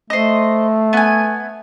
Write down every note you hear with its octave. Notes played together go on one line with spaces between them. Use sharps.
A3 C5 D#5
B3 G#5